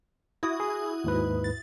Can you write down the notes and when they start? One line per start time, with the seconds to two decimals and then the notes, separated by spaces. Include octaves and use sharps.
0.43 E4 F#4 D#6
0.60 G#4
1.04 D#2 G#2 B4
1.44 A6